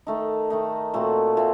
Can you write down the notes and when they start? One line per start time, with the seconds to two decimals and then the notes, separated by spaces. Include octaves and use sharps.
0.07 D#3 A3 D#4
0.50 D#3 A3 D#4
0.94 A#2 A3 C4 F#4
1.37 A#2 A3 C4